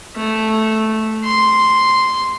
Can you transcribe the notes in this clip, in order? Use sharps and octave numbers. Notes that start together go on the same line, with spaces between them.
A3
C6